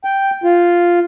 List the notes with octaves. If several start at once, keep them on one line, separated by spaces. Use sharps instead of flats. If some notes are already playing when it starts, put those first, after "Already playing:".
G5
F4